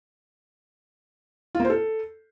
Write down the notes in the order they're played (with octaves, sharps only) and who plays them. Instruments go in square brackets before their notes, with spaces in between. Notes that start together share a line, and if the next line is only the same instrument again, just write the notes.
[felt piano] F4
A#3
C5
A4